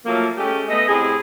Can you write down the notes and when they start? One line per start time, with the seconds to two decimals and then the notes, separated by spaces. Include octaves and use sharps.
0.06 F3 F#3 A3 A#3
0.36 G#3 A3 C#4 G4
0.68 A3 B3 D#5
0.87 A2 C3 G#4